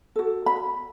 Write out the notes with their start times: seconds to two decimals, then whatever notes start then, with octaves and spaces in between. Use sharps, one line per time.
0.16 F#4 A4
0.46 B5